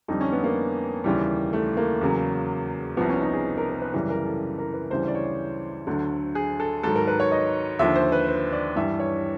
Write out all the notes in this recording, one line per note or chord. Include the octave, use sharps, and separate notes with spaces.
F2 D3 G3 D#4
C#4
B3
A#3
D#2 C#3 E3 G3
A3
A#3
E2 C#3 F#3
C2 C3 F3 B3
C#4
D#4
G#4
A#4
A#4
B4
F#2 C#3 E3 G3 B4
A#4
A4
A#4
B4
D2 C#3 E3 G3 C5
D5
C#5
D2 D3 F#3
G#4
A4
G#2 D#3 F#3 A4
A#4
B4
C#5
D#5
D#2 D3 F3 E5
C5
B4
C5
D5
G2 E3 G3 E5
C#5